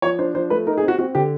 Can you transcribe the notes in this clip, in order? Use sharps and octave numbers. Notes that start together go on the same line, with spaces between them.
F3 C#5
D4 C5
F3 C5
A3 B4
D#4 A#4
G#4
C4
F#4
C4 F#4
D3 G4